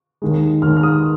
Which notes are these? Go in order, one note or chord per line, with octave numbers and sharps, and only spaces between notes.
D#2 D#3 G#3
D#2 D#3 G#3 F6
F6
D#6